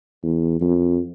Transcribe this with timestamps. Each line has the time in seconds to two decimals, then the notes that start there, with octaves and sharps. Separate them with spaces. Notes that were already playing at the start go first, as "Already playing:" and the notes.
0.23 E2
0.61 F2